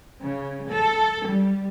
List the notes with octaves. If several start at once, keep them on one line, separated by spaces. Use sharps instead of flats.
C#3
A4
G3